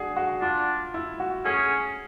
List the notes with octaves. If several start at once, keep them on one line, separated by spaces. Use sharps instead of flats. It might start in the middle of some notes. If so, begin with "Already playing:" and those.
Already playing: D4 F#4 G#4
F#4
D4 F4
E4
F#4
C#4 G#4